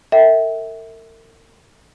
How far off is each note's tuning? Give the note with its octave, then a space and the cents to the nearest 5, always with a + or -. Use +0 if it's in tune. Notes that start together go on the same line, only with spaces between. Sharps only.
A#4 -45 E5 -25 G5 -20